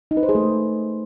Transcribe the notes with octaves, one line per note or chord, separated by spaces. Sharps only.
D#4
B4
C5
G#4
A3